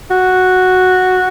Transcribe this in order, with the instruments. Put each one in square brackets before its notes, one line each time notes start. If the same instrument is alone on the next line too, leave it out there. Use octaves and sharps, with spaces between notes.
[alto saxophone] F#4